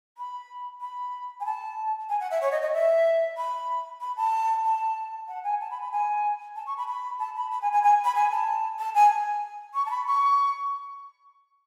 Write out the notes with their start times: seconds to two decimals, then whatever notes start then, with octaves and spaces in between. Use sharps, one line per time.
0.18 B5
0.81 B5
1.40 G#5
1.45 A5
2.09 G#5
2.20 F#5
2.31 E5
2.41 C#5
2.52 D#5
2.62 D#5
2.73 E5
3.37 B5
4.01 B5
4.17 A5
4.64 A5
5.28 F#5
5.44 G#5
5.60 A5
5.71 B5
5.81 B5
5.92 G#5
6.56 A5
6.66 C#6
6.77 B5
6.87 B5
7.19 A5
7.35 B5
7.51 B5
7.62 G#5
7.72 G#5
7.83 G#5
8.04 B5
8.15 G#5
8.31 A5
8.79 A5
8.94 G#5
9.74 C#6
9.86 A5
9.91 B5
10.06 C#6